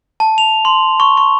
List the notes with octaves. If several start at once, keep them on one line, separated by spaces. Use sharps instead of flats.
A5
F7
C6
C#6
C#6